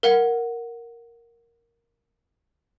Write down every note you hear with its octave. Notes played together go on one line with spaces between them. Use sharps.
A#4 F5 F#5